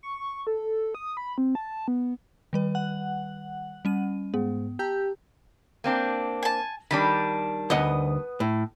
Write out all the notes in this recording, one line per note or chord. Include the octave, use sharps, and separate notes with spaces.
C#6
A4
D#6
B5
C4
A5
B3
D#3 G3 B4
F#5
G3 C#4 D#7
G#2 B3
G4 A5 A#5 E6
A#3 C4 D4
G#5 A5
D#3 G3 D4 B5
D2 B3 D#5 F#5 D#6
A2